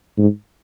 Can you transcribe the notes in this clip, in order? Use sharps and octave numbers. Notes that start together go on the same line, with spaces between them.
G#2